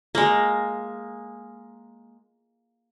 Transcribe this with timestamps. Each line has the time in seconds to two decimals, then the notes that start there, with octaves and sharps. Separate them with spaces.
0.15 G#3 A#3